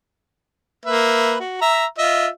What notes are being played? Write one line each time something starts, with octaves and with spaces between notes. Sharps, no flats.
A#3 B4 E5
F#4
E5 A#5
F4 D#5 E5